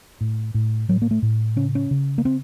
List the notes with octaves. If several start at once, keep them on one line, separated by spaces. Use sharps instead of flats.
A2
A2
A2 F#3
A#3
A3
A2
C#3 C#4
C#4
C#3
A#3
C4